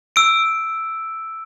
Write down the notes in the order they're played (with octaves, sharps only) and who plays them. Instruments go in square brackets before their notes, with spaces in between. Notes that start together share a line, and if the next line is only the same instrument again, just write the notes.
[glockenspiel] E6 D7